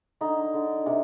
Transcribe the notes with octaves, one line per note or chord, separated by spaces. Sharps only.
D3 D#4
D3
C3